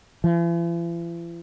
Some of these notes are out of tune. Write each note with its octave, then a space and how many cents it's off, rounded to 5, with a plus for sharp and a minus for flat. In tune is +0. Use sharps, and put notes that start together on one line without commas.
E3 +45